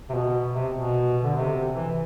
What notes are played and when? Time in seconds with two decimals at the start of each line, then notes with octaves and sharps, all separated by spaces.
0.09 C3
0.14 B2
0.54 C3
0.74 B2
1.23 D3
1.35 C3
1.74 E3